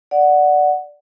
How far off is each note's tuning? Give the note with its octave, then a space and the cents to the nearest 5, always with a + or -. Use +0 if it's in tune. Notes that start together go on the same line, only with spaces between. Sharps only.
D5 +0 F#5 +0